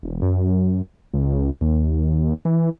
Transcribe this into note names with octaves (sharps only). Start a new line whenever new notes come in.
E1
F#2
C#2
D#2
E3